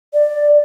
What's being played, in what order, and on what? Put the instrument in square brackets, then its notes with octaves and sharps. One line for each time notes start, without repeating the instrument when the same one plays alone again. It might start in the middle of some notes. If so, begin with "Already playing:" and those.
[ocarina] D5